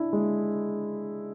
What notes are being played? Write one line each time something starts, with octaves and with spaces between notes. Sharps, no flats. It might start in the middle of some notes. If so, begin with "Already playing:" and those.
Already playing: D4 E4
G#3